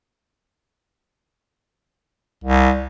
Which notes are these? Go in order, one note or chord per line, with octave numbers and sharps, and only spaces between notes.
C2